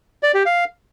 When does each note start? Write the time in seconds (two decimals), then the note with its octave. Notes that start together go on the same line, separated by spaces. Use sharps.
0.23 D5
0.34 G4
0.46 F5